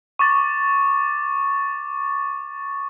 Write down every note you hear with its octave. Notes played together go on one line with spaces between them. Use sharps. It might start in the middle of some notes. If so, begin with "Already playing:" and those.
C#6 D6 A6